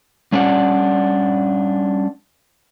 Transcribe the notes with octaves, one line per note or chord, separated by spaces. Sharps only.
G3 C#4 D4 D5 F#5